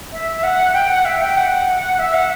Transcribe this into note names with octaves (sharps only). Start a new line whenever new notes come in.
E5
F#5
G5
F#5
E5
G5
F#5
E5
F#5